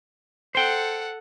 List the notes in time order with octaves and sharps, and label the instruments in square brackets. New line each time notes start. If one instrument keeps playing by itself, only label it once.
[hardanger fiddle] A4 F#5 [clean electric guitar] C5 G5